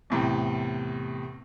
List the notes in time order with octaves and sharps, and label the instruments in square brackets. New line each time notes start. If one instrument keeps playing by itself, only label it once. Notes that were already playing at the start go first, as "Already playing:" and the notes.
[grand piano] E2 A2 C3